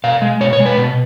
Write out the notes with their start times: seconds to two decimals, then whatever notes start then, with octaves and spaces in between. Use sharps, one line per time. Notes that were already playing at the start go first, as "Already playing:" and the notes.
0.04 B2 F5
0.22 G#3
0.40 B2 C#5
0.53 C#5
0.59 G#3
0.66 B4
0.78 B2